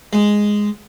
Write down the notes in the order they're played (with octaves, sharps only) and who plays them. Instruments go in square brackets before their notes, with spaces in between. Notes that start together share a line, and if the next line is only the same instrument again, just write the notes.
[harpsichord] G#3